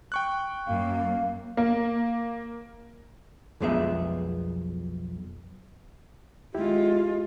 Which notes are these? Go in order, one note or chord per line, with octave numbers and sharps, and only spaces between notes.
G5 C#6 F#6
F#2 A#3 F5
A#3
B1 F2 G#3 B3 G#4 E5
D#2 G#3 E4 F4 G4